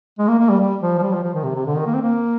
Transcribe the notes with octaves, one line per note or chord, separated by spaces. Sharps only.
G#3
A#3
A#3
G3
G3
F3
F3
G3
F3
F3
D#3
C3
C3
D3
D#3
A#3
C4
A#3